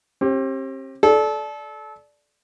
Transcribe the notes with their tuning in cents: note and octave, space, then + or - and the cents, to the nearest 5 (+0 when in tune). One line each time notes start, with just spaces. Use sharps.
C4 +40 G4 +0
A4 -25 D5 +0